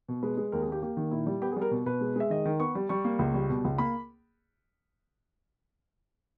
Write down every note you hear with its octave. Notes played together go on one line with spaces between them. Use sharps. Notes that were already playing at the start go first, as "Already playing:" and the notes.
B2
G#3 B4
G#3
D#2 A#4
G#4
A#3 G4
A#3 G4
D#3
A#2 E4
G3
B3 G4
G#4
G3
A#4
B2
B2 B4
G#3
G#3 E5
D#3 D#5
D#3
B3 C#6
G3
G3 C#6
A#3
C#2
G3
B2
C#2
A#3 B5